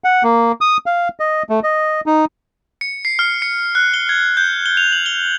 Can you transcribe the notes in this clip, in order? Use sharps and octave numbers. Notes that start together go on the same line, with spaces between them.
F#5
A#3
D#6
F5
D#5
A3
D#5
D#4
C#7
C7
F6
C#7
F#6
G7
G#6
G6
G7
F7
F#7
G7